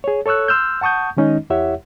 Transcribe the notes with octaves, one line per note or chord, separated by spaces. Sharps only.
G#4 C#5
A4 C#5 C#6 E6 F#6
C6 E6 F6 G6
F#5 A5 C#6 D#6 G6
D#3 G#3 C#4 D#4 D#5
E2 E4 G4 C#5 E5 F#5